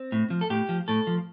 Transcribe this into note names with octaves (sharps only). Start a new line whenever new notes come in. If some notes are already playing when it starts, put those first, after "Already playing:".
Already playing: C4
A2
F3
A4
A2 G4
F3
A2 A4
F3